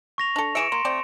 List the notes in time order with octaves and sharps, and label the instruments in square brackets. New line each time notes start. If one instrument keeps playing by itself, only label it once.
[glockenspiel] C#6 A#6 F7
[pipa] D4 A4
[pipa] E3 G#4 E5 [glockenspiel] C#7 D7 E7
[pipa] A#3 [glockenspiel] C6
[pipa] A3 C4 D5